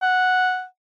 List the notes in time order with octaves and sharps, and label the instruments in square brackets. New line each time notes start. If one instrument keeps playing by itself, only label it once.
[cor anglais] F#5